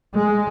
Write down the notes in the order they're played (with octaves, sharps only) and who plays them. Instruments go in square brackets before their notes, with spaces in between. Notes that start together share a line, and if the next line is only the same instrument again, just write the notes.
[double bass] G#3